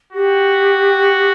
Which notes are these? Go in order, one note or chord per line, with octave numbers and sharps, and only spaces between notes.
F#4 G4